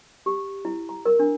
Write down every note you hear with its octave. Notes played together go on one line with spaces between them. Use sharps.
G4
E4
A#5
A#4
D4